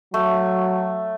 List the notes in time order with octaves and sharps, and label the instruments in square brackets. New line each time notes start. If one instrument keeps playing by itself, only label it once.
[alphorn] F#3 [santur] A3